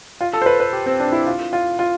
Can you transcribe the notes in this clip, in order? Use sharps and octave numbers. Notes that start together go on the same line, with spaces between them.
F4
A4
C5
B4
B4
G4
C4
D4
E4
F4
F4
F4